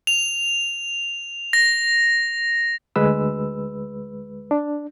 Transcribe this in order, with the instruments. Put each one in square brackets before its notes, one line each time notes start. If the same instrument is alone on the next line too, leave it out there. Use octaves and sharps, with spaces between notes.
[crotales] F7
A#6
[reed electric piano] D2 G#3 B4 E6
D4